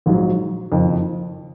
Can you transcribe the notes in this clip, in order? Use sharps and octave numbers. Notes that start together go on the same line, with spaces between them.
A#1 G#2 F#3
F#1 F2 D#3